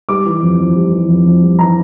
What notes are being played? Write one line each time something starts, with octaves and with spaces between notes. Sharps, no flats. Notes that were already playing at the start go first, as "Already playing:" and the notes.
G3 D6
E3
F2
F2
G3
E3
F2
F2
G3
E3 A#5